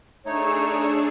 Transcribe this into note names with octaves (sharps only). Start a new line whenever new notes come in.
A3 D4 D#4 G#4 C#5 E6